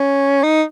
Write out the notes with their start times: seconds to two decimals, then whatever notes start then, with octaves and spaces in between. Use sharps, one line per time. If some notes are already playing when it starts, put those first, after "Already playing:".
Already playing: C#4
0.43 D#4